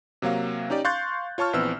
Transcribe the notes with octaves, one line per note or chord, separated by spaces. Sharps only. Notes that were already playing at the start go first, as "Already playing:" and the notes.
C3 F#3 A#3 F5
C#4 D#4 G4 D5
F5 C6 C#6 F#6 G6 A6
F4 C#5 A5 C#6 F6
A#1 E3 B3 C4 E6